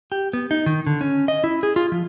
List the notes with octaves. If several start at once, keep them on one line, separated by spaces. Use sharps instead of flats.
G4
B3
D#4
D#3
D3
C#4
D#5
E4
G#4
F4
F3